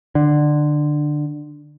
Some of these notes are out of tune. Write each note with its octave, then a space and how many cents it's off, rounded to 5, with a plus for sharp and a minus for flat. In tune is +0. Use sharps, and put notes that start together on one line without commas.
D3 +20